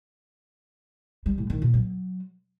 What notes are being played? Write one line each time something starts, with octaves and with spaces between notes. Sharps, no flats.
G3
A2
D#3
A#2
F#3